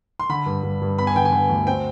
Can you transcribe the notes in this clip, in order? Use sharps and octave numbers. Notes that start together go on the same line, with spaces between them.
C6
D3 B5
G2
G2
G2
B3 B5
G#5
D3 G5
G#5
D3
D2
C4 G5